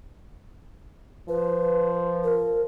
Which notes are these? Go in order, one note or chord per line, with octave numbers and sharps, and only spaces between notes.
F3 B4
A#4